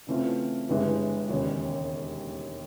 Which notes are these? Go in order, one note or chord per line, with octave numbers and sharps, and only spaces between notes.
C#3 E3 A3 C4 F4
G1 G2 E3 G#3
E1 D#2 C#3